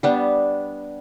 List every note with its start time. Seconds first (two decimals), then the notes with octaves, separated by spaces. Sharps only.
0.03 G3 B3 D4